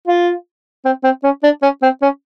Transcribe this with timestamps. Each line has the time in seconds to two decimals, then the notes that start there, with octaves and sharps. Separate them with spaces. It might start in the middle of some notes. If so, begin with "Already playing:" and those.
0.07 F4
0.85 C4
1.04 C4
1.24 C#4
1.44 D4
1.62 C#4
1.82 C4
2.02 C#4